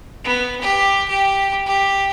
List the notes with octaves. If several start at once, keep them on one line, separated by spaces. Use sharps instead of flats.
B3
G4
G4
G4